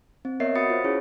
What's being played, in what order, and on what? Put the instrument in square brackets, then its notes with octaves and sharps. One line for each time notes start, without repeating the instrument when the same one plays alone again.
[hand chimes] C4
B3 A#4 C#5 D#5 E5 C7
F#4 F#5 B5 D#6 A6 C#7
F4 C5
C#4 E4 G#4 C#5